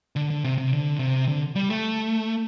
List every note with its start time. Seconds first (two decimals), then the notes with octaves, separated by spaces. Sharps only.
0.16 D3
0.30 D3
0.44 C3
0.58 C3
0.72 D3
0.99 C3
1.28 D3
1.55 G3
1.70 A3